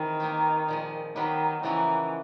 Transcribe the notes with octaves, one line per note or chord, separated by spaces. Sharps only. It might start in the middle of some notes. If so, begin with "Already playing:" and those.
Already playing: D#3 E3 G#3 C4 F4
A#3 D#4 G4 C5
A#2 F3 G#3
D#3 F#3 B3 D#4 G4 B4
C#3 E3 F3 A#3 D#4 F#4